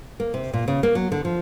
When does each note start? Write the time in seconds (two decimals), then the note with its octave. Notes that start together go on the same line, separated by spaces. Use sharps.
0.20 A#3
0.34 C3
0.53 A#2
0.68 C#3
0.83 A#3
0.95 F#3
1.12 D3
1.25 F3